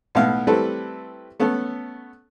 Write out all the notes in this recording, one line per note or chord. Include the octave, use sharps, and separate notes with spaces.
B1 A2 B3 F5
G3 A3 C4 E4 A4 B4
A3 B3 C#4 A4